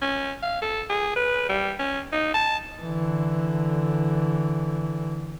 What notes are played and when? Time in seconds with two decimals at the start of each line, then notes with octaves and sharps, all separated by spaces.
0.01 C#4
0.42 F5
0.62 A4
0.90 G#4
1.16 B4
1.49 G3
1.79 C#4
2.12 D#4
2.34 A5
2.81 D3 E3